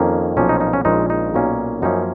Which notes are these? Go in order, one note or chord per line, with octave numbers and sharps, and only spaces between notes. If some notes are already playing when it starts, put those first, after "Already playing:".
Already playing: F2 D#3 A#3 C#4
B1 A#2 F3 A#3 C#4
D#4
D#4
C#4
A#1 A#2 F3 G#3 C#4 D#4
D#4
B1 A#2 F#3 A#3 C#4
F#2 F3 A#3 C#4 D#4